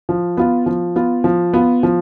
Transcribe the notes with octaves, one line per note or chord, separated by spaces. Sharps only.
F3
B3 F4
F3
B3 F4
F3
B3 F4
F3